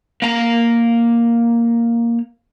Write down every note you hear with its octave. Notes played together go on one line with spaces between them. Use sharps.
A#3 A#5